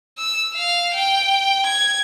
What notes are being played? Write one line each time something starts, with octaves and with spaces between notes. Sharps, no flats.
E6
F5
G5
G#6